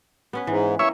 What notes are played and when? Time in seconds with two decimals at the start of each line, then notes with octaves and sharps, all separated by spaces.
0.33 B3 C#4 B4
0.47 G#2 E3
0.79 E3 A#3 C#5 E5